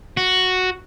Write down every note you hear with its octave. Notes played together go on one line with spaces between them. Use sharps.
F#4